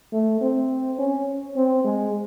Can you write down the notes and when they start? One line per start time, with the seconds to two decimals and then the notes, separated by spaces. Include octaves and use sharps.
0.13 A3
0.41 C4
0.99 C#4
1.56 C4
1.85 G#3